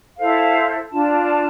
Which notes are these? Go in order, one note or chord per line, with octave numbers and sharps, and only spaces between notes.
E4 A4 C5 F5
D4 F4 A5